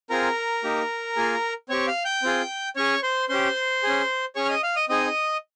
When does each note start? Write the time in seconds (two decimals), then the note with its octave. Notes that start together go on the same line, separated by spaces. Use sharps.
0.10 C4 F4 G#4 A#4 A#5
0.64 A#3 D#4 G4
1.16 A#3 F4 G#4
1.69 C4 G4 C#5 C#6
1.87 F5 F6
2.05 G5 G6
2.23 C4 F4 G#4
2.76 C#4 G#4 C#5 C#6
3.03 C5 C6
3.29 C#4 G4 C5 C6
3.83 C#4 G#4
4.36 C#4 G#4 C#5 C#6
4.45 F6
4.49 D#5 D#6
4.63 F5 F6
4.76 D#5 D#6
4.89 C4 D#4 G#4 D#5 D#6